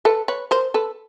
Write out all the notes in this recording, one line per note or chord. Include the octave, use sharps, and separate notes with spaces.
A4 B4
B4 C#5
A#4 C5
A4 B4